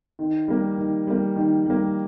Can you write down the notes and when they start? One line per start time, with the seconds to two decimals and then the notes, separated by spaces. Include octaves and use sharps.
0.19 D#3
0.48 G3 A#3
0.78 D#3
1.07 G3 A#3
1.36 D#3
1.66 G3 A#3